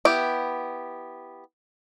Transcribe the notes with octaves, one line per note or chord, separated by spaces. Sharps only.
B3 E4 G4